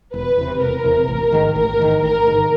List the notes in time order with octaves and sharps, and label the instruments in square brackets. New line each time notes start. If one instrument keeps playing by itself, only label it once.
[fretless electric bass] E1 [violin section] B4
[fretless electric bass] E2 C3
[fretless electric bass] E1 [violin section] A#4
[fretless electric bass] E2 C3
A1
G#2 D#3
[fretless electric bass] A1 [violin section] A#4
[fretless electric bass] G#2 D#3
[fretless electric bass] A1 [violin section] A#4
[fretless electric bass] G#2 D#3